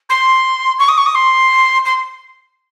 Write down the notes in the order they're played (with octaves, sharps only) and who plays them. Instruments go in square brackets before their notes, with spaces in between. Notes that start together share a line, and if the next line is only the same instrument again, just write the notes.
[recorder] C6
C#6
D#6
C#6
D#6
C6
C6